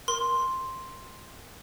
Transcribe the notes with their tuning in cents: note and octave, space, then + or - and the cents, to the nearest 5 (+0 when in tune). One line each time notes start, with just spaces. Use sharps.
A#4 +25 C6 +0